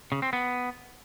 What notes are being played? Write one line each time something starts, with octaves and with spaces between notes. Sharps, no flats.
C#3
C4
B3